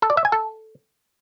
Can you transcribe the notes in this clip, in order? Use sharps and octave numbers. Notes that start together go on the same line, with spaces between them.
A4
D5
E5
G#5
A4